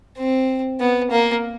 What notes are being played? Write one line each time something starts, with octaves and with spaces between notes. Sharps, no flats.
C4
B3
A#3